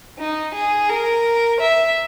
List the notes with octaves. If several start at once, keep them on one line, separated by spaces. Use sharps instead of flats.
D#4
G#4
A#4
E5